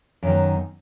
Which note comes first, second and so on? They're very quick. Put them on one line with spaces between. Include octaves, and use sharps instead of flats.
F#2 D#3 B3